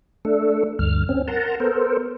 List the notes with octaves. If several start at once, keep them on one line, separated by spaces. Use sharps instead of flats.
A3 D4 A4
D2 G2 F6
C4 C#4
A#4 F#5 A5 A#5 C6
B3 A4 A#4 C5